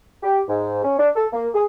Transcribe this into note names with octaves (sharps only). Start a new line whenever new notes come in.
G4
G#2
C#4
D4
A4
A#3
G#4